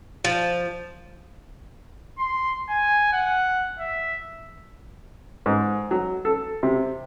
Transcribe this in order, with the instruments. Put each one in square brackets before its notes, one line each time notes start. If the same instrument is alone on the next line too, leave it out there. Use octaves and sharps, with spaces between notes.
[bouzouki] F3
[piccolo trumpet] C6
G#5
F#5
E5
[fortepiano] G#2
F#3
A4
C3